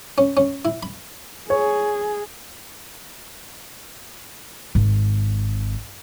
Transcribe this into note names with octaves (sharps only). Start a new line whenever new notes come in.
C#4
C#4
E4
B5
G#4 C#5
G#1